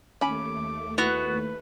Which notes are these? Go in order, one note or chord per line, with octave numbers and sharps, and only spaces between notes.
D#2 A3 C#4 B5 D6
B3 E4 F#4 B4